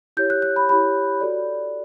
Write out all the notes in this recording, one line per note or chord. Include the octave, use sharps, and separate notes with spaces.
E4 G4 C#5 G6
F#6
F#6
B5
E4 G4 C#5 B5
F#4 A4 D5